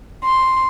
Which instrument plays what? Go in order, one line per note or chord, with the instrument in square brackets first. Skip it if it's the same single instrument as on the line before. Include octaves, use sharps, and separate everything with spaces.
[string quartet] C6